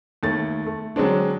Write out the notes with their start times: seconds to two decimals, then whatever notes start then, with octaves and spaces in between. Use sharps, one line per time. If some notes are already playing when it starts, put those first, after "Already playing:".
0.23 D#2 A3 A6
0.66 A3
0.96 D3 F#3 G#3 C4 D4